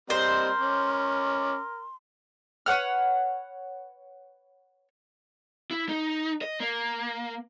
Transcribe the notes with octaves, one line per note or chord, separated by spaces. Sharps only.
G3 C4 A#4 C5 D#5 C6
C#4 D6
B4 C#5 F#5 F6
E4
D#4
D#5
A#3